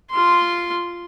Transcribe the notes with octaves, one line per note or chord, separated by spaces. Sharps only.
F4 C6